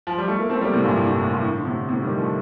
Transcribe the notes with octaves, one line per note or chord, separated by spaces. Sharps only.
F3
G3
A3
A#3
A3 C4
G3 A#3
A2 C3
G2 A#2
A2
G2
A2
G2
A2
D3
A2 C3
A2 C3
D#3 G3
F3 A3